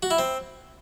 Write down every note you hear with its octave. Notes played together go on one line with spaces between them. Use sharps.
F#4
E4
C4